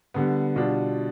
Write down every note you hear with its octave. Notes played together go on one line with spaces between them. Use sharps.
D3 G3 B3
B2 G3 D4 F4